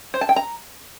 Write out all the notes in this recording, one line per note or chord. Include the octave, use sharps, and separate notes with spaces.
C5
A5
G5
A#5